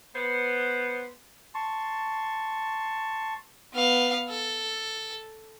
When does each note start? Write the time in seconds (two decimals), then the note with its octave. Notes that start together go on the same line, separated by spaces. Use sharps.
0.15 B3 C5
1.55 A5 C6 C#6
3.73 B3 F5
4.29 A4